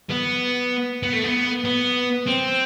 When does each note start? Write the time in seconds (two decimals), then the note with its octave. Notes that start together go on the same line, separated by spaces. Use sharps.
0.10 B3
1.03 B3
1.13 A3
1.24 B3
1.65 B3
2.27 C4